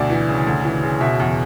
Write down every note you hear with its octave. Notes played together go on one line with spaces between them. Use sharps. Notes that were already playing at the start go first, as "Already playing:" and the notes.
Already playing: D2 B2 D5
E3
C#3
D2
E3
C#3
B2 E5
E2